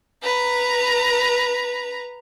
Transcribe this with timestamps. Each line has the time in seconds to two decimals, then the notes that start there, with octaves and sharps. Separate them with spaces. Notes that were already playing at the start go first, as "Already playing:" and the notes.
0.23 B4 A#5